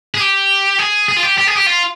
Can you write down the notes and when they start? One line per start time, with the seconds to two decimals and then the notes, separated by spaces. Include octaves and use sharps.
0.15 G#4
0.20 G4
0.79 G#4
1.09 G#4
1.17 F4
1.23 G4
1.38 G4
1.47 G#4
1.57 G4
1.67 F4